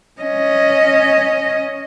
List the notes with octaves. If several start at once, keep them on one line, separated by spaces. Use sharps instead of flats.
C#4 D#5